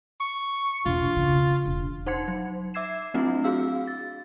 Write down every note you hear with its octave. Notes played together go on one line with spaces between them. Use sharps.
C#6
E1 F4
C#3
E1
D#4 C5 F#5 C6 G#6 C#7
F#3
E5 D6 E6 G#6 C7 E7
F#3 A3 C4 D4 E4 F4
F#4 G#4 F5 E6
A6